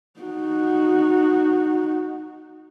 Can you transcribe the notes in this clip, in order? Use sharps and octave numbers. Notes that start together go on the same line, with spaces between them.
D#4 F#4